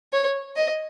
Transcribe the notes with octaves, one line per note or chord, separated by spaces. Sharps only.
C#5
D#5